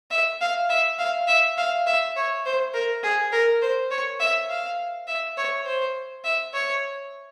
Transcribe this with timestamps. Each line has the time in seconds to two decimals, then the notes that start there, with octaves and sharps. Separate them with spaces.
0.11 E5
0.41 F5
0.70 E5
0.99 F5
1.28 E5
1.58 F5
1.87 E5
2.16 C#5
2.46 C5
2.74 A#4
3.03 G#4
3.32 A#4
3.62 C5
3.91 C#5
4.20 E5
4.50 F5
5.08 E5
5.37 C#5
5.66 C5
6.24 E5
6.54 C#5